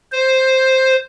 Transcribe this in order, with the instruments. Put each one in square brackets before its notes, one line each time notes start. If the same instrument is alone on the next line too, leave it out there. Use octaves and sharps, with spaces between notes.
[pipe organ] C5